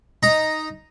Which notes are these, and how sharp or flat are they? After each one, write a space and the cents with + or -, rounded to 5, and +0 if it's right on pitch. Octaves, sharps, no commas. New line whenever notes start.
D#4 +0 A#5 +0